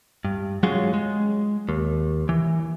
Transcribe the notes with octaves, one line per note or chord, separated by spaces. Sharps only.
G2
F#3 G#3 C#4 F4 F#4 G#4
G#3
D#2
E3